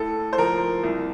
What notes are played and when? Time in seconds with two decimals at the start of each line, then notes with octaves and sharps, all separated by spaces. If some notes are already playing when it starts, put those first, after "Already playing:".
Already playing: A2 A4
0.33 C5
0.38 F3 A#4
0.84 C2